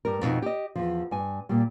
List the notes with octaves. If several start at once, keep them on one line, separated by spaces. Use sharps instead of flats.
G2 G3 A#4
F2 B2 B3 D#4
G4 D#5
E2 F3
G2 G#5
A#2 G3